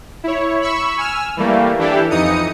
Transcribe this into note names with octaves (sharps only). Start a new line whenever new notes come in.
E4 C#5
B5 C#6 E6
G#5 E6 F6
E3 G3 A3 A#3
E3 D4 E4 G4 A4
F2 E3 D#4 D#6 C#7